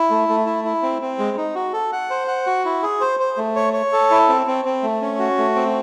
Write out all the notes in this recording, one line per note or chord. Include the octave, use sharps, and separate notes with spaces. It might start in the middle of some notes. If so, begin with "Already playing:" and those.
Already playing: E4
A3
A3
E4
E4
C4
C4
G#3
D#4
F#4
A4
F#5
C5
F#5
F#4
E4
G#4
C5
C5
A3
C#5
C#5
A4
E4
C4
C4
C4
A3
C#4
F#4
A3
C4